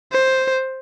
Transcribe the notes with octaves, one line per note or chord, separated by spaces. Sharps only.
C5